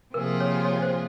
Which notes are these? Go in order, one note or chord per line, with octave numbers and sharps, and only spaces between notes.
C3 F3 A#3 F4 G#4 A#4
C#5
C#5
C5